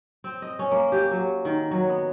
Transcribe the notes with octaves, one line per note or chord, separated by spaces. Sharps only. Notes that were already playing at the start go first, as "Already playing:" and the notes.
C4
D#5
C#4
A#3
G4
F#3
D#3
F#3
B3